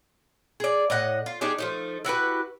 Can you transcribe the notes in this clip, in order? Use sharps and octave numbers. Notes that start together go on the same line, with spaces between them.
G#4 D5
A2 D#5 F#5
F4
D4 D#4 G4 G#4
F3 A3 D#4
E4 F#4 G4 B4